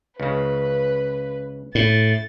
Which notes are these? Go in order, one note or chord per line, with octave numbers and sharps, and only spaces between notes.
C#2 C#3 B4
A2 A6